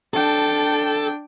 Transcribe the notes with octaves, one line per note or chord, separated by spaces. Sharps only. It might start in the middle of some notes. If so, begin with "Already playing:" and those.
D4 A4 G5